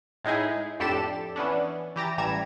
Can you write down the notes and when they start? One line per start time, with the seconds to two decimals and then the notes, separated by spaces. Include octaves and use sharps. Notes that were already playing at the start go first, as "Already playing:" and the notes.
0.24 A2 G#3 D#4 E4 G#4
0.80 F2 A2 D4 G4 A4 E7
1.36 E3 B3 C#4 D4
1.96 E3 G4 A#5 A6
2.17 A1 E3 G3 A#5 G#6 E7